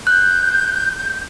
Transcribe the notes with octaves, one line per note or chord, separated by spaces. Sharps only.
F#6 G6